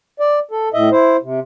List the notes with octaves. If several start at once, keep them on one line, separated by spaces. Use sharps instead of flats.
D5
A4
A2 D#5 E5
E4 C5
C3